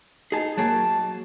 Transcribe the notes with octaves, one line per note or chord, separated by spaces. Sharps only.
D#4 G#4 A5
F#3 A#3 G#4 A5